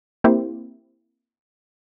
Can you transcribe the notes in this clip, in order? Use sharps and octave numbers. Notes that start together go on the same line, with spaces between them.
A#3 C4 E4 G4 C5